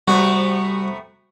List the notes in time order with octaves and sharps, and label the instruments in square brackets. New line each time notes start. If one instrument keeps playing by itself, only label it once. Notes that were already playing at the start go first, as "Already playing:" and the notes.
[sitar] C3 A3 B3 [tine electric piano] G3 [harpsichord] F#4